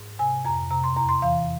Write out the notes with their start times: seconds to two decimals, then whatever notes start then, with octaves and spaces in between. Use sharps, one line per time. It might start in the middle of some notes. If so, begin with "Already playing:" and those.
Already playing: G#2
0.19 C3 G#5
0.45 F2 A#5
0.71 C3 A#5
0.84 C6
0.96 E2 A#5
1.09 C6
1.22 E3 F5